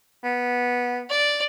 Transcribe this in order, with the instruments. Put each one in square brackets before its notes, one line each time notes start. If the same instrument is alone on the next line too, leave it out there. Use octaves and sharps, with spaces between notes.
[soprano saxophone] B3
[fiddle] D5